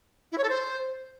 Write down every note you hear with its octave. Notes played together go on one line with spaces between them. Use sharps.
E4
C#5
A4
C5